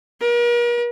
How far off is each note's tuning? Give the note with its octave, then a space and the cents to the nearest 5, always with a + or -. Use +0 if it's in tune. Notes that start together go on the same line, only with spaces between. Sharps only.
A#4 +45